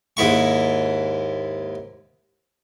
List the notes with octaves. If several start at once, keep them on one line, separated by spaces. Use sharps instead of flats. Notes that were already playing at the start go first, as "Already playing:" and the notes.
D#2 G#2 E4 C#6